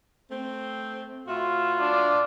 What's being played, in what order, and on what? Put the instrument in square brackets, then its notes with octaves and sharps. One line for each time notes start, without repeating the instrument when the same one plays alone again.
[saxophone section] A3 C4
[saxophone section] A2 F#4 E5 [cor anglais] F4
[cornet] D4